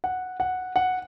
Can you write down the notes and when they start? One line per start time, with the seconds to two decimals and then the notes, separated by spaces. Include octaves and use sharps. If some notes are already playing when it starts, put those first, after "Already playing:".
0.04 F#5
0.40 F#5
0.76 F#5